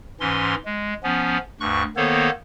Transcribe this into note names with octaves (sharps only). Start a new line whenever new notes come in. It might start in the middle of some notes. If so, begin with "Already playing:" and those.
G#2 E3 C#4 C6
G#3
F3 B3 C#4
D2 G2 C#6 F#6
D#3 A#3 B3 A4 C5 C#5